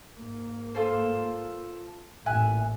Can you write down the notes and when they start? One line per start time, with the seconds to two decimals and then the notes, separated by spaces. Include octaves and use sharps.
0.17 G#2 A#3
0.75 F4 A4 C5
2.26 A1 A#2 E5 G#5 F#6